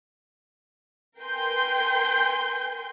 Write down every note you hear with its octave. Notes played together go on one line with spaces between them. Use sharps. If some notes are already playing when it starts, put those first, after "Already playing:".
A#4 B4 G5 G#5 C6 G6